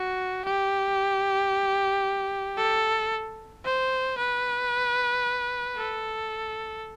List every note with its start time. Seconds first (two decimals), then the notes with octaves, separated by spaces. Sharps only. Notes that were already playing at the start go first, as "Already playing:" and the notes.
Already playing: F#4
0.45 G4
2.57 A4
3.65 C5
4.17 B4
5.77 A4